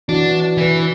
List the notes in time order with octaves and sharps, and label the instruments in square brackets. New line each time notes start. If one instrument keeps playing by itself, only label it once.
[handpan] E3 F#4 [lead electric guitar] D4
[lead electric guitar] E3 [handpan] E4 B4